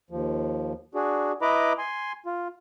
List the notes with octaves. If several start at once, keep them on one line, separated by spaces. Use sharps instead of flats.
D#2 F3
D4 F#4 G#4
E4 B4 D#5 A#5 B5 D6
G#5 C6
F4